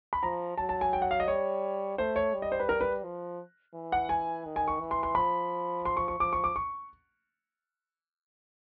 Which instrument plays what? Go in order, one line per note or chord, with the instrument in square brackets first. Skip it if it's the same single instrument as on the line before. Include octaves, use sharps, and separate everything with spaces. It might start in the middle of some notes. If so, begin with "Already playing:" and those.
[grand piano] B5
[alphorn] F3 [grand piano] A#5
[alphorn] F#3 [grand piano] A5
[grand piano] A5
G#5
G5
F#5
F5
D#5
[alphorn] G3 [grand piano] C#5
[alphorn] A3 [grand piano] C5
[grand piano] C#5
[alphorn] G3
[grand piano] D#5
C5
B4
A#4
B4
[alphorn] F3
E3
[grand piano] F#5
G#5
[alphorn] D#3
[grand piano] G#5
C#6
[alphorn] E3
[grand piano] C6
C6
[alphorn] F3 [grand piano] B5
[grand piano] C6
C#6
C#6
[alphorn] F3 [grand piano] D6
[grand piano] C#6
D6
C#6